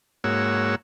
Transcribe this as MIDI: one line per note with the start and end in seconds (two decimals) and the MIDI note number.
0.24 0.75 44
0.24 0.75 58
0.24 0.75 66
0.24 0.75 73
0.24 0.75 88